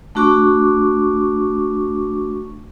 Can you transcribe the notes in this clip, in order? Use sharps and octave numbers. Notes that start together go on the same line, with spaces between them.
A3 D4 F#4 C#6 D6